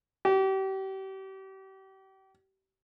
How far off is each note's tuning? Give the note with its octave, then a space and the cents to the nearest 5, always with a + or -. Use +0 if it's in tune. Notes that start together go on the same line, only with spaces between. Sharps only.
G4 -35